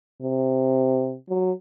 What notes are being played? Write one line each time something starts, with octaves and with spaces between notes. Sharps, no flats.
C3
F#3